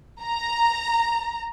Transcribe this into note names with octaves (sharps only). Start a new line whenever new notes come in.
A#5